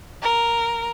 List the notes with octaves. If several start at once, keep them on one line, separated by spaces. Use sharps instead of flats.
A#4